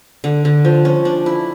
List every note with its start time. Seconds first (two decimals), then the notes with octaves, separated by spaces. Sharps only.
0.24 D3
0.45 D3
0.65 F3
0.85 C#4
1.05 D4
1.26 E4